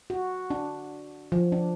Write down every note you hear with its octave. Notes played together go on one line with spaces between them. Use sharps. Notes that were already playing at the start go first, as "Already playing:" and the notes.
F#4
D4
F3
D4